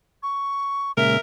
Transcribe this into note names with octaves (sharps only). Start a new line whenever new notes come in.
C#6
A#2 C#3 G#3 A#4 E5